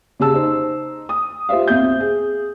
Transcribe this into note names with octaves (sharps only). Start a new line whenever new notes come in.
C#3 G4 G#4 A5 E6
D#4 C5
D#6
F4 G4 C5 E5 F5
B1 C4 E5 G6
G#4